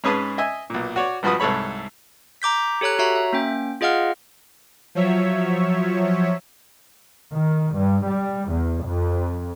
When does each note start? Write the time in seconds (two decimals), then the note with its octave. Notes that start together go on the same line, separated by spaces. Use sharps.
0.04 G#2 C#4 G#4 B4 A5 D#6
0.38 D#5 E5 G#5 D#6
0.70 B1 A#2
0.96 F#4 C#5 D5
1.23 G#1 G2 F3 F#4 B4 D#6
1.40 C2 G#2 A4 C#5 B5
2.42 A#5 D6 G6 B6
2.81 G4 A4 C#5 A#5 F#6
2.99 F#4 C#5 E5 A#5
3.16 E5
3.33 A#3 C#4 G5
3.81 F4 G#4 D#5 F5 F#5 F6
4.95 F3 F#3 C#5 E5
7.31 D#3
7.76 G2
8.07 G3
8.50 E2
8.85 F2